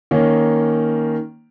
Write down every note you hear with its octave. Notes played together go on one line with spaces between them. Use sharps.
D#3 A#3 C#4